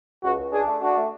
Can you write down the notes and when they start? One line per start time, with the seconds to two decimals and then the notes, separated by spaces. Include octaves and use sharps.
0.23 C#2 F#4
0.39 C#2
0.52 D4 G#4
0.67 A3
0.82 D4 F#4
0.96 A3